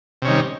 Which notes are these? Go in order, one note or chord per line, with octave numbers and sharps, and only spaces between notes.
C3 D#3 G3 C#4